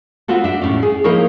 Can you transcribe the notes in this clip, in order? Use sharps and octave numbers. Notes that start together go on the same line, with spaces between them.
B3 C4 F4 F#4 A4
D4 E5
E2 A2 C#4
G#4
F3 A#3 D#4 E4 A#4 C#5